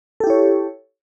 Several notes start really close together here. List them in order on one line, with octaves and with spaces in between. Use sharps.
A4 G4 E4 C#5